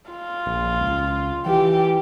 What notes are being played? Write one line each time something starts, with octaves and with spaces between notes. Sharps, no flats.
F4
A#1
C#2
E3 G4